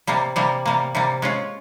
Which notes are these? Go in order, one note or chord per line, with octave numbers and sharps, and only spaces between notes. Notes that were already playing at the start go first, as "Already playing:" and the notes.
C3 G3 A#3
C3 G3 A#3
C3 G3 A#3
C3 G3 A#3
G#3 C#4 F4